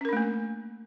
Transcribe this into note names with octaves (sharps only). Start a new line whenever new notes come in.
A3 A#3 C#4 D4 A#4